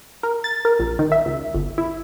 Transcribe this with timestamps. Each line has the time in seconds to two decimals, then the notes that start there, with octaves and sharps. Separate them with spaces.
0.23 A#4
0.44 A6
0.65 A#4
0.79 A#1
0.99 D#3
1.12 E5
1.26 C#2
1.54 G1
1.78 E4